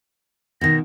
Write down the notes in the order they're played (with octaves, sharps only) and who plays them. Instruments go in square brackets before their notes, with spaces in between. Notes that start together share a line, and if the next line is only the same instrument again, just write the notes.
[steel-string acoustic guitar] B2 D#3 [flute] A#6